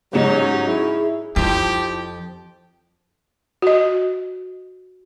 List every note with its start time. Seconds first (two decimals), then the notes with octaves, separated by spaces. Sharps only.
0.13 G#2 C#3 F#3 C#4 D#4 G4 C#5
0.68 E4 G#4
1.36 F2 F3 D#4 E4 G4
3.62 F#4 D#5